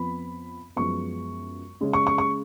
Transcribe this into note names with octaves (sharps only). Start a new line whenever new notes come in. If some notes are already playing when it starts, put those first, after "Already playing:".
Already playing: F2 F3 B3 B5
F#2 F3 G#3 B3 C#6
C#3 G#3 C#4
C#6
C#6
C#6